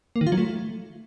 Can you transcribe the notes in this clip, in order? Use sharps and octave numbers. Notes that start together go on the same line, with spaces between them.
A#3
D#3
F4
F#3
A3